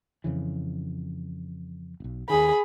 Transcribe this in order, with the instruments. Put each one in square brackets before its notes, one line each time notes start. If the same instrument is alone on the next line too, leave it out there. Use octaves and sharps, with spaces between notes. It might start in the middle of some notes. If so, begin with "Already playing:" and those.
[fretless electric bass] F2 C#3 E3
D#1 B1
[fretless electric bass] D#2 D#3 [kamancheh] G#4 B5